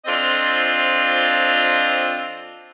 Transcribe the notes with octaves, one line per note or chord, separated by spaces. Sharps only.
F3 C4 D4 F4 A4 D#5